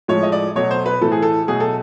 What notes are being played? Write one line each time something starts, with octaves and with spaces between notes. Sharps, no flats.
A2 F3 G#3 C#5
D#5
D5
B2 F#3 A3 C#5
C5
B4
A2 E3 A3 A4
G#4
A4
B2 F#3 A3 G#4
A4